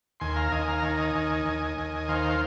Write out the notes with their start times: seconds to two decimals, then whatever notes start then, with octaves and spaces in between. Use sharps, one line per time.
0.20 D#2 G#5 C6
0.36 F5 A#5
0.52 D#2 D#5 G#5
0.67 F5 A#5
0.83 D#3 G#5
0.90 A#5
0.98 D#5 G#5
1.15 D#2
1.45 D#2
1.77 D#2
2.08 D#3 C5 F5